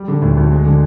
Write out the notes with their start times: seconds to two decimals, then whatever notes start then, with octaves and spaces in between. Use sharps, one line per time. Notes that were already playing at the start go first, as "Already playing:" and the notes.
Already playing: G3
0.08 D3
0.22 D2
0.37 D2
0.51 G#3
0.65 D3